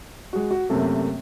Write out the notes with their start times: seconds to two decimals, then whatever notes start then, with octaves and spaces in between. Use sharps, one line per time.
0.33 G#3 F#4
0.51 F#4
0.69 F#2 C3 A3 A#3